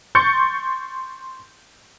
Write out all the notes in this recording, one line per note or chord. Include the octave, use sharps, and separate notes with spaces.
C6 C#6 G6 A6 C#7